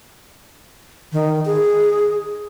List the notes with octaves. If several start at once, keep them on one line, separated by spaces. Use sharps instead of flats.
D#3
G#4